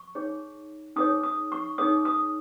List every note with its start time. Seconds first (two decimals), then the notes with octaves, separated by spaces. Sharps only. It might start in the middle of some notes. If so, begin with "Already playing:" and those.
Already playing: C#6
0.15 D#4 G#4 C#5
0.96 D#4 G#4 C#5 D#6
1.23 D#6
1.52 C#6
1.78 D#4 G#4 C#5 D#6
2.05 D#6